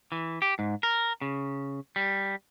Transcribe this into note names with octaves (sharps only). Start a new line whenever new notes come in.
E3
G4
G#2
A#4
C#3
G3